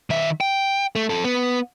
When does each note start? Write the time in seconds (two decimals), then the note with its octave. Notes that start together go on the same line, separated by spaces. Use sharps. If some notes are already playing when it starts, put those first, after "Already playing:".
0.10 D#3 E5
0.41 G5
0.96 A3
1.10 F2 A4
1.24 B3